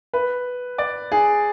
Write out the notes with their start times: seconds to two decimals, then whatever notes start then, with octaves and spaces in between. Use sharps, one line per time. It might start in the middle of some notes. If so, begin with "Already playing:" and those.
0.13 B4
0.78 D5
1.12 G#4